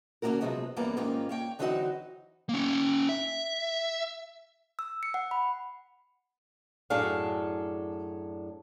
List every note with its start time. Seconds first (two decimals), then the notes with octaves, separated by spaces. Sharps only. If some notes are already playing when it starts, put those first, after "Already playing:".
0.22 D3 A#3 C4 C#4 F#4 A#4
0.41 C3 F3 F#3 G#3 B3
0.76 F#2 E3 G3 A#3 B3 A#5
0.97 G#2 D#3 A#3 C#4 F4 G4
1.29 A#3 C#5 G5
1.59 D3 E3 F#3 C4 D#4 F#4
2.49 A#3 C#4
3.09 E5
4.79 E6
5.03 C#7
5.14 F#5
5.31 B5
6.90 F#2 A2 D4 G#4 A4 F5